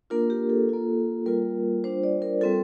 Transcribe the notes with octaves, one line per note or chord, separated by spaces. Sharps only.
A#3 D4 F4 A#4
G4
A4
A#3 F4
G3 A#3 F4 A#4
G3 D4 F4 C5
D5
A#4
G3 C4 F4 A4